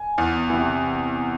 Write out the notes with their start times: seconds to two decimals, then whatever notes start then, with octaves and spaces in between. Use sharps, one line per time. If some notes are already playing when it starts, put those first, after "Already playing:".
Already playing: G#5
0.18 E2
0.50 C3 E3